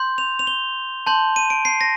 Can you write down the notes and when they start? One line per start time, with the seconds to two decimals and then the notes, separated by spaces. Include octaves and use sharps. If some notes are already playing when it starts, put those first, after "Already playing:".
Already playing: C6 G6
0.18 F7
0.39 F7
0.47 G7
1.07 A5 C6 G6
1.36 D#7
1.50 D7
1.65 C7
1.81 A#6